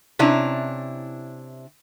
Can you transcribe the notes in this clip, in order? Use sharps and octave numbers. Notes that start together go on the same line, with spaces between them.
C3 C#4 D4 E4 A#5